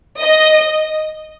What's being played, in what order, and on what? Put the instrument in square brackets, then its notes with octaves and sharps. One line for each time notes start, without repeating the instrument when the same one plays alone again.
[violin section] D#5